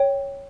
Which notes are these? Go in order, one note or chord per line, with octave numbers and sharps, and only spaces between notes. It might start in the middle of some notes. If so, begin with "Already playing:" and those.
Already playing: C#5 G5